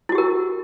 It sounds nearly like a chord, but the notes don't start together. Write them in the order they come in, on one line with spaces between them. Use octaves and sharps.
E4 F#4 G4 A#4